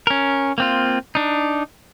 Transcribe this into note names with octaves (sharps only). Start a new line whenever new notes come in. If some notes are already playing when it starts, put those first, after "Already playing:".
C#4 A#4
A#3 C4 F4
D4 D#4